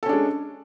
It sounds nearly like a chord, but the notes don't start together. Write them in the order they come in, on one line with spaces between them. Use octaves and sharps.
A4 C#4 D4 G#3